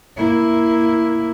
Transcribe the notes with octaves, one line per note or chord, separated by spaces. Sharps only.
A#3 E4